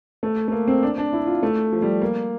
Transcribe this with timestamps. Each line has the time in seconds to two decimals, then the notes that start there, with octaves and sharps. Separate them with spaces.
0.23 A3
0.48 A3
0.52 A#3
0.68 C4
0.83 D4
0.98 D4
1.13 E4
1.27 F4
1.43 A3
1.73 F3
1.82 G3
2.02 A#3